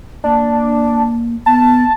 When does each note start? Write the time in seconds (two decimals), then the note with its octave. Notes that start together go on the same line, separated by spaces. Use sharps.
0.24 A#3 D4
1.46 B3 A5